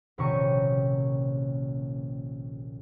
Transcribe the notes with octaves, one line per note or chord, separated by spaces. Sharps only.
D#1 A#1 C3 C#4 G5 C#6